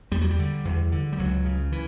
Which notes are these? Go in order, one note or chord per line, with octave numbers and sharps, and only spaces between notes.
E2 G3
F#3
G3
D3
E2
D3
G3
C#2 F#3
C#3
E3